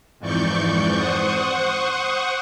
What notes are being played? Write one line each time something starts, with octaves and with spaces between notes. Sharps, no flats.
F2 G#2 E3 D5 C#6 G6
C5 F#5 C#6 D#6